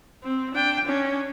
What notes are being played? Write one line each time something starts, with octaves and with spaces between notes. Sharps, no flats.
C4
D4 G5
C#4 D4